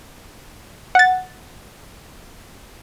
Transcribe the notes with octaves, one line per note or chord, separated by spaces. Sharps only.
F#5 A6